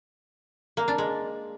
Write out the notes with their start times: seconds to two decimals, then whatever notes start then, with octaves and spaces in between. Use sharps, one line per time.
0.77 A#3
0.88 D4
0.98 G#3